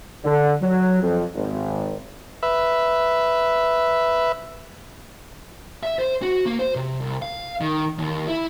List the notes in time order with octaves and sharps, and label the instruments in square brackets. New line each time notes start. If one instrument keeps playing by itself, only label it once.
[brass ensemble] D3
F#3
F2
G#1
[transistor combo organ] B4 E5
[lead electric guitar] E5
C5
F#4
A#3
C5
C3
C2
F5
D#3
D#2
E4